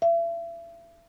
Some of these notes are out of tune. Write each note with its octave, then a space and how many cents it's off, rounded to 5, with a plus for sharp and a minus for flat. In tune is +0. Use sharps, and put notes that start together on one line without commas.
E5 +40